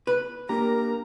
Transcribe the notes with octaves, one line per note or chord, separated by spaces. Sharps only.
B4
A#3 D4 G4 A#4 A#5